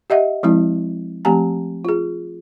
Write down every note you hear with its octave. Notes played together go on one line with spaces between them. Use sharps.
G4 D#5 E5 F#5
F3 G#3 C4 E4
F3 A3 C4 G4 G#5 A#5
F4 G#4